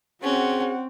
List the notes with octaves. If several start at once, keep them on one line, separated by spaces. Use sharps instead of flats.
C4 C#4 F#4 G#4 F#5